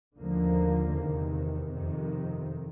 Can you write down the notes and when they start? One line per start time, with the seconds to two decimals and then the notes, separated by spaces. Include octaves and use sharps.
0.17 D#2 D3 F3 A#3
0.92 E2 C3 D#3
1.69 F2 C3 D#3